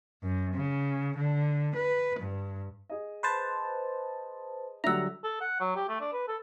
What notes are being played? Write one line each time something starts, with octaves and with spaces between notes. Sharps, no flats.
F#2
C#3
D3
B4
G2
G#4 D#5
B4 C5 A5
D3 F#3 G3 E5 F#5 A#5 E6
A4
F#5
F#3
G4
A3
D4
B4
A4